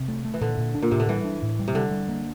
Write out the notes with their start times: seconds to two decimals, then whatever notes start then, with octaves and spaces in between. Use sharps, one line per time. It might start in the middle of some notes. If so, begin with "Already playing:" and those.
Already playing: C3
0.08 A3
0.25 A3
0.34 E3
0.41 A#2 D3
0.58 A#2
0.75 D4
0.82 A#2
0.91 A2 C3
1.00 D3
1.09 E3 G3
1.25 D4
1.43 A2
1.59 G3
1.68 C3
1.75 D3 G3
1.91 G3
2.08 A#3